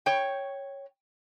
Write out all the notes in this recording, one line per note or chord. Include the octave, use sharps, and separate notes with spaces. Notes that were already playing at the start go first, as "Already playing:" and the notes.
C#5 G5